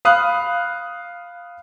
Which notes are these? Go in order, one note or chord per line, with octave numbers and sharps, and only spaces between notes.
F5 B5 D#6 F6 F#6